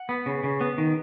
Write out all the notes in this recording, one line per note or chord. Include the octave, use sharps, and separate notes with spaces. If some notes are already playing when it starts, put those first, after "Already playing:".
Already playing: F#5
B3
C#3
C#3
B3
D#3